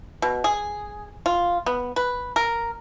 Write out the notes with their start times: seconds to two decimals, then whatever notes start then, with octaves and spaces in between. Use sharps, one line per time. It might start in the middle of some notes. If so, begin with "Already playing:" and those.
0.22 B2
0.44 G#4
1.26 F4
1.66 B3
1.96 B4
2.36 A#4